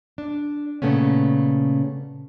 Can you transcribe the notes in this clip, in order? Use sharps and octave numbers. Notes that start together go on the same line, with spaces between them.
D4
A#2 C#3 A3 B3 C#4